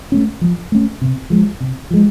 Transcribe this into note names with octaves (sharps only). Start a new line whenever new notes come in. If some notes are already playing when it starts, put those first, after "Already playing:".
A3 C#4
F3
A3 C#4
C3
F3 G#3
C3
F3 G#3